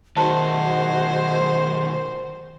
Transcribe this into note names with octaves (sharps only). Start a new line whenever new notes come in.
B1 D#3 F#4 G#4 C5 D#5 A5